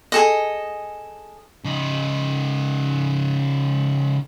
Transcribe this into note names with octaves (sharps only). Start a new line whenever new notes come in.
G#4 A4 D#5
C#3 D#4